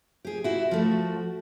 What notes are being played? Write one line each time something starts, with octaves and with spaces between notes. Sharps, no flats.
G4 G#4
E4 F#4
F3 A3 F#4